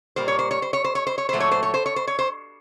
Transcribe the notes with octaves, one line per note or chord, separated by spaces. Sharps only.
A#2 G3 A#3 C5
C#5
C5
C#5
C5
C#5
C5
C#5
C5
C#5
A#2 F#3 A3 C5
C#5
C5
C#5
C5
C#5
C5
C#5
C5